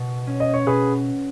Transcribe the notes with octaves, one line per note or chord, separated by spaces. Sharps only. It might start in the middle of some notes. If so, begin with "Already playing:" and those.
Already playing: B2
C#4
D#5
C#5
B2 G#4 B4